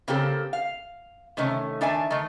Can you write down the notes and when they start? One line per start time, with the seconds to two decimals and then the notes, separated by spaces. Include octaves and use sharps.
0.08 C#3 A#3 C4 G4 A4
0.53 F5
1.37 C3 D#3 A3 C#4
1.81 D#3 D4 E5 G#5 A5
2.11 D#3 A3